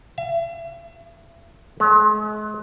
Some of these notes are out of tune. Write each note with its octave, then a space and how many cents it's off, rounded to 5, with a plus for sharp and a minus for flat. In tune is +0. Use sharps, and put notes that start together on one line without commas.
E5 +40
G#3 +40